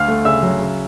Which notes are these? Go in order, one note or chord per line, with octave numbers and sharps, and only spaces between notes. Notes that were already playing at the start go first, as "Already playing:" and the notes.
Already playing: D2 F5 F6
A3
C#3 E5 E6
F#3
C#3